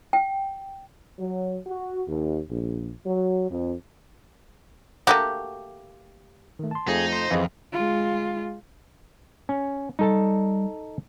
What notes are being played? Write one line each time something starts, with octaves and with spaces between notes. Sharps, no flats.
G5
F#3
F#4
D#2
A#1
F#3
F2
A3 A#3 F#4 G4
D#3 A3
A5 C6
F2 A3 D#4 G#4
C5
F2 E3 C4 G#4 D#5 F5
G#3 F4
C#4
G3 D#4 A4 A5